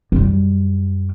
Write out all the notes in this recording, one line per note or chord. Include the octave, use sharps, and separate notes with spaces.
F#2 G3